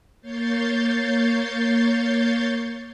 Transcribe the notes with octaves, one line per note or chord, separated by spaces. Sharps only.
A#3 C#5 G6 A6 C7